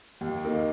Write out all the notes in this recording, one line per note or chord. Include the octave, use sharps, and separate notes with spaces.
D#2
D#3 A#3